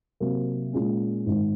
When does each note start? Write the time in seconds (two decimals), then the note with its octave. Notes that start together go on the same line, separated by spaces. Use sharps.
0.20 C3 F#3 A#3
0.73 A#2 G#3 C#4
1.26 G#1 G#2 D#3